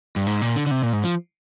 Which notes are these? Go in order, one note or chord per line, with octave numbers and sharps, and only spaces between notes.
G2
G#2
A#2
D3
D3
C3
A#2
G#2
F3